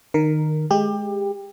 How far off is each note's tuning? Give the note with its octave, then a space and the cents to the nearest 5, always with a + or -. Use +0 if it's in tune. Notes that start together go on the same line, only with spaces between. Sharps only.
D#3 -20 A#4 +0
G#3 +15 G4 +25